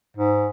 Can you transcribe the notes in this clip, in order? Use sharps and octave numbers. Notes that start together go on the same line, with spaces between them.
G#2